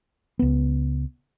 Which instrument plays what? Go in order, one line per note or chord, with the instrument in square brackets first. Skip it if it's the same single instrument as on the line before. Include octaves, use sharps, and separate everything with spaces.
[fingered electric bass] C#2 B3